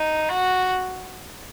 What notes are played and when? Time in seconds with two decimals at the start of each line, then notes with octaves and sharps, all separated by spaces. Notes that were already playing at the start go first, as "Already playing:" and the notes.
Already playing: D#4
0.29 F#4